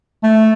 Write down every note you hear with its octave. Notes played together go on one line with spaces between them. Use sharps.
A3